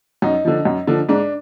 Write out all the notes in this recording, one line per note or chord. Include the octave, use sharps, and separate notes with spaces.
F#2 D#4
D3 F3
F#2
D3 F3
G#2 D4